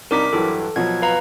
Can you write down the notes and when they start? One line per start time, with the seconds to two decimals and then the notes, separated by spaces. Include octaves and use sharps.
0.11 C2 D4 D#4 A#4 D6 B6
0.33 G2 E3 F#3 A4
0.76 B2 F3 F#3 G#6
1.02 B4 F5 A#5